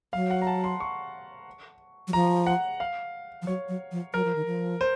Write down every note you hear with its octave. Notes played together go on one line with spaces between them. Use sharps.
F#3 F5
F#5
A#5
A5
C6
C#6
F#3
F3 A#5
F#5
F5
F3
F#3 C#5
F#3
F3
F#3 A#4
F3
D#3
F3
C5